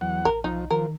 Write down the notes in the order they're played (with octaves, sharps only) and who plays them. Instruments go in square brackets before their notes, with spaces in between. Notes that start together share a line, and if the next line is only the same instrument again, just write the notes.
[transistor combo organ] E2 F#5 [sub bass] F#3
[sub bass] A1 [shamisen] A#4
[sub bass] B1 [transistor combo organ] F3 [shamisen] D#4
[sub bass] D#3 [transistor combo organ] F3 [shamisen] A#4